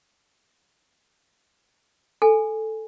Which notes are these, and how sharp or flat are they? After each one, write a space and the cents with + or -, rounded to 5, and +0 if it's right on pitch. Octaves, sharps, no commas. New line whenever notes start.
A4 +0 G#5 +0